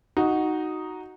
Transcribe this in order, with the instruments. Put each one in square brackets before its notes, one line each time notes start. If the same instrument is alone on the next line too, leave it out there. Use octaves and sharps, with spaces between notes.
[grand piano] D#4 F#4